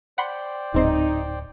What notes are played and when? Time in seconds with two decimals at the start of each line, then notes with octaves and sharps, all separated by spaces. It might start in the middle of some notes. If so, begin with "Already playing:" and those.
0.18 C5 D5 F#5 G5 B5 C6
0.74 D1 G#2 C4 D#4 C7